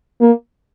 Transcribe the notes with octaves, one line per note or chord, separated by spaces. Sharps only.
A#3